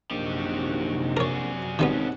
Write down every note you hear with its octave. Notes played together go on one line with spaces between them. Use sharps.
A#1 F#2 C3 D#3 F#4 G4
G#4 A#4 C#5 D5
G#1 B2 D#3 G3 B3 C#4 F#5